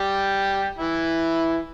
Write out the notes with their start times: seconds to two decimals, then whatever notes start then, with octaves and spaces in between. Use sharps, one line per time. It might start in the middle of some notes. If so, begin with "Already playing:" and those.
Already playing: G3 G4
0.78 E3 E4